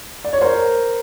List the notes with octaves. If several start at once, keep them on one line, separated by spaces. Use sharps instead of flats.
D5
C#5
A#4 C5